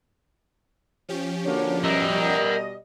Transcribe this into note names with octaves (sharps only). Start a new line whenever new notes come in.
F3 C#4 G4
D3 A#3 D4 F#4 C#5
B2 G3 A#4 D#5 E5